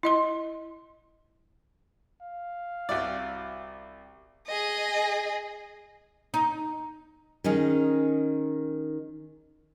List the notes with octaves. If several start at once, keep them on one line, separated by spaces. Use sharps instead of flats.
E4 D#5 C6
F5
C2 E4 F#4 D5
G#4 D#5
D#4
D#3 C#4 D#4 G#4